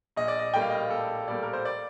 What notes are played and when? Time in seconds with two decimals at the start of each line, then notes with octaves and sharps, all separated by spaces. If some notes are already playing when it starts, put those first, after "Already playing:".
0.16 A#1 D#5
0.28 D5
0.39 D#5
0.54 A2 G3 A#3 G5
0.61 F5
0.70 D#5
0.77 F5
0.90 A#1 A4
1.28 A2 G3 A#3 D5
1.43 A#4
1.53 C5
1.65 D5